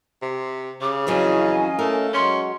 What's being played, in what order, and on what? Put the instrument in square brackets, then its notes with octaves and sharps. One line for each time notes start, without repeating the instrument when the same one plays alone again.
[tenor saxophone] C3
[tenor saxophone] C#3 [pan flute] D6
[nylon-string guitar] F2 E3 F#3 [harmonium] C#4 D#5 F5 [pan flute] G#5
[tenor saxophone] A3 [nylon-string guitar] A#4
[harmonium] F#3 G#3 [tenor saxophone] C#4 [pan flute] C6